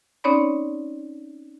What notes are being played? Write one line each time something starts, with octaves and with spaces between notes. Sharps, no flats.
C4 C#4 D#4 C#5 D5 B5